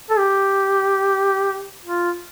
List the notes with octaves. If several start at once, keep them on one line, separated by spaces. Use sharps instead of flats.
A4
G4
F4